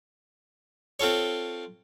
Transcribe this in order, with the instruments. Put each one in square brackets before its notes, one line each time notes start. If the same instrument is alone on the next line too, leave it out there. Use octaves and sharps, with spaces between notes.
[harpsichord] C4 F4 A4 C#5